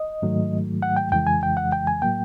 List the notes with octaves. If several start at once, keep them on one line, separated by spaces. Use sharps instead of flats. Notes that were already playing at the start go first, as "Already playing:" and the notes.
Already playing: D#5
G#2 D#3 F#3 A3
F#5
G5
F2 C#3 E3 G#3 G5
G#5
G5
F#5
G5
G#5
A2 F#3 A#3 G5